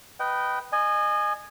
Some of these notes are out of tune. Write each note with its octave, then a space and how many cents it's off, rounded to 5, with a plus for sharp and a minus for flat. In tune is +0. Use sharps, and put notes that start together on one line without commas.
B4 +0 D#5 -10 G5 -20
D#5 -30 G#5 +0